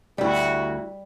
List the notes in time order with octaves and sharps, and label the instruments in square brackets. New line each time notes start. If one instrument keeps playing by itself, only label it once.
[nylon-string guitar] D2 E4 [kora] G3 [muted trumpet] F#4